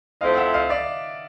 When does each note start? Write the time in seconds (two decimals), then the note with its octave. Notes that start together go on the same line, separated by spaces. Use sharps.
0.21 F3 A3 C4 E4 D#5 F5
0.37 E5 F#5
0.54 D#5 F5
0.70 D5 E5